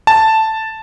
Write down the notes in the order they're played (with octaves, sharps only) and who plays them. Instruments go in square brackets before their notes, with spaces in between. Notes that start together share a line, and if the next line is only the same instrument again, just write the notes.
[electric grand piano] A5